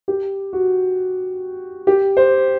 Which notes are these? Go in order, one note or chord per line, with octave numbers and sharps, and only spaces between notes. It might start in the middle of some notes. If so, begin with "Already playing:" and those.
G4
F#4
G4
C5